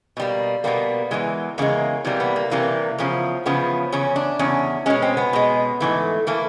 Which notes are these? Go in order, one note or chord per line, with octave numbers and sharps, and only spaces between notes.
B2 G3 A#3
B2 G3 A#3 B3
E2 C#3 E3 G#3
E2 C#3 E3 G#3 A#3
C3 E3 G3 A#3
B3
A#3
C3 E3 G3 A#3
E2 C#3 F3
E2 C#3 F3 B3
E2 C#3 C#4
D4
E2 C#3 C#4
B2 G#3 C#4
C4
B3
B2 G#3
G#2 E3 A3
E3 A3 A#3